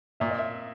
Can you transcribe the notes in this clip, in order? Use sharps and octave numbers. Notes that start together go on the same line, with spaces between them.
A#2 E5
D#5
E5